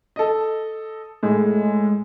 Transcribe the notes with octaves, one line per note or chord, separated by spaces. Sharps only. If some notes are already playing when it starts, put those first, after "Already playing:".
A4 D#5
A2 G#3